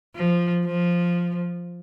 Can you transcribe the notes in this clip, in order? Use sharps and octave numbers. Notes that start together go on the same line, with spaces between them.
F3
F3